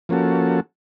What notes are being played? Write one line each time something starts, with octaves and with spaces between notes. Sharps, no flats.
F3 A#3 C#4 F#4 A4